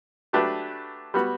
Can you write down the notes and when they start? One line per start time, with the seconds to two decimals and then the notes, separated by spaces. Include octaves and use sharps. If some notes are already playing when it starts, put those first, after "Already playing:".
0.33 F#3 A3 D4 G4 B4
1.14 G3 B3 F#4